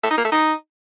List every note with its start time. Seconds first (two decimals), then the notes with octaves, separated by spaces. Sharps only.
0.03 A3
0.10 D#4
0.17 A#3
0.24 A3
0.32 D#4